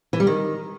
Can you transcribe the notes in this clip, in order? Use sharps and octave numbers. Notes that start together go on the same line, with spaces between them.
E3
G3
D#3